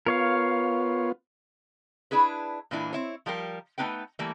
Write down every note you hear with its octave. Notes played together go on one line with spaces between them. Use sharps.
B3 F4 A#4 C#5 F5
D4 E4 G#4 B4
A#2 E3 D4 E4
C4 E4 C#5
F3 G3 G4 A#4
A3 B3 D4 D#4 B4 G5
E3 G3 A3 A#3